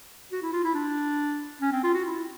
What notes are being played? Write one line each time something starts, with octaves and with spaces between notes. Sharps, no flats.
F#4
E4
F4
E4
D4
C#4
C4
F4
F#4
E4